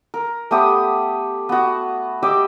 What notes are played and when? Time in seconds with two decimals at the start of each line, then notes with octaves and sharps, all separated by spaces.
0.14 A#4
0.51 A3 B3 G4 D#6
1.49 B3 F#4
2.23 G4 D#5 D6 E6